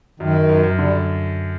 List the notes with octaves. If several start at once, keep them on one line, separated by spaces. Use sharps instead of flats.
F#2 D#3
F#2
F#2
F#2
D3 G3